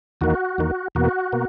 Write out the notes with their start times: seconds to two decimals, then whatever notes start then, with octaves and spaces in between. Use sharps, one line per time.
0.21 E2 D#3 A#3 F#4
0.58 E2 D#3 A#3
0.95 E2 B2 A#3 F#4
1.32 B2 A#3